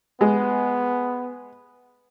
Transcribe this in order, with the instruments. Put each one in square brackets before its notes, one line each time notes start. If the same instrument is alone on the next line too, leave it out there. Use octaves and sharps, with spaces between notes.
[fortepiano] G#3 [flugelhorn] B3